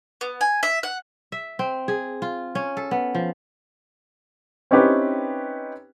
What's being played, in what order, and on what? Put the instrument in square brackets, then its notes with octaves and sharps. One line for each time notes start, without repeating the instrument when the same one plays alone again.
[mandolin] B3
G#5
E5
F#5
[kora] E5
C4
G#4
F4
C#4
A4
B3
F3
[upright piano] C4 C#4 D#4 E4 G4 B4